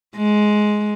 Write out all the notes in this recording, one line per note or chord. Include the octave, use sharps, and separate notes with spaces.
G#3